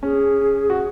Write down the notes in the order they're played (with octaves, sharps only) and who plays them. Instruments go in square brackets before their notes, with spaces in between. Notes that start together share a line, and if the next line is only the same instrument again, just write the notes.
[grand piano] C#4 [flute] G#4
[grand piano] F#4